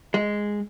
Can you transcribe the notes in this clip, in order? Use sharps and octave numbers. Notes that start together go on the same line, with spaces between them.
G#3